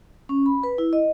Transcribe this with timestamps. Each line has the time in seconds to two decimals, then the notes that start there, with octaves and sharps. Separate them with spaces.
0.29 C#4
0.46 B5
0.63 B4
0.78 E4
0.93 D#5